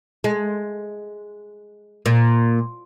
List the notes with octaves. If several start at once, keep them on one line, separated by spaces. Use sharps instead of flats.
G#3
A#2